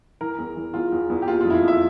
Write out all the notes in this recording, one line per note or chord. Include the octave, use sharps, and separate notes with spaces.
E3 A#4
E2
E3
E2 F4
E2
E2
G4
A#3 F4
F4
F2
E4
F4
F2
E5